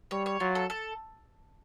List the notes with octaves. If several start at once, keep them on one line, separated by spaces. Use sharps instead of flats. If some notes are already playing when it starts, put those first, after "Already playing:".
G3 C#5
C#5
F#3 F4
A4
A4